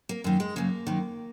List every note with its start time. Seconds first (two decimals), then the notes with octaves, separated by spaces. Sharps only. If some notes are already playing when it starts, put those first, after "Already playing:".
0.09 A#3
0.24 F#2 D#3 A#3
0.40 G#3
0.56 F#2 C#3 A#3
0.87 F#2 D#3